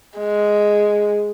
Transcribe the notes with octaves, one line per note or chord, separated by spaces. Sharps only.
G#3